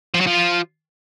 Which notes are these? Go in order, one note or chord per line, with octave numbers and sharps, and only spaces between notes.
F3
F#3
F3